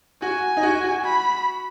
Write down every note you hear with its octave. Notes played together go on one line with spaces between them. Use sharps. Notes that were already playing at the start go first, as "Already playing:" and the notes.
F#4 G#5
D#4
F#4
F#4
B5